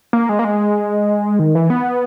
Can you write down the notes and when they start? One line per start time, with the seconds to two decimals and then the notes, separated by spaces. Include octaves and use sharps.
0.13 A#3
0.29 G#3
0.39 A#3
0.45 G#3
1.39 D#3
1.55 E3
1.70 B3